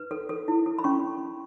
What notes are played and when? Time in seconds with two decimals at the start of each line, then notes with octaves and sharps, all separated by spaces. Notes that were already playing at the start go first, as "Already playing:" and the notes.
Already playing: B4
0.11 A4
0.29 A4
0.48 E4
0.66 A4
0.79 B5
0.84 C#4 C#6